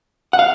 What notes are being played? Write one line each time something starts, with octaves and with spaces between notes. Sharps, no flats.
F#5
F5